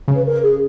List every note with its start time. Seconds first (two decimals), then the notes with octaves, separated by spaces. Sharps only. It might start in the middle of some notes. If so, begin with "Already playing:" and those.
0.08 C#3
0.14 B4
0.25 A#4
0.43 G#4